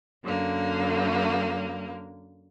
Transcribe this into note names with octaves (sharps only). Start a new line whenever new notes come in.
F#2 D3 A#3